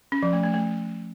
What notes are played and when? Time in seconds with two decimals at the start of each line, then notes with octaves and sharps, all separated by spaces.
0.12 C#4
0.23 F3
0.33 A3
0.43 A3
0.54 A3